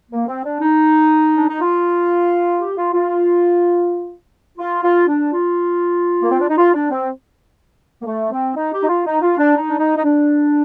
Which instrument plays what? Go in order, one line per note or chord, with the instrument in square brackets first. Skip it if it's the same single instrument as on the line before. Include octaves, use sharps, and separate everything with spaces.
[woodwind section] A#3
C4
D4
D#4
D4
D#4
F4
G4
F4
F4
F4
F4
D4
F4
A#3
C4
D4
D#4
F4
D4
C4
A#3
A3
C4
D#4
G4
D#4
F4
D#4
F4
D4
D#4
D4
D#4
D#4
D4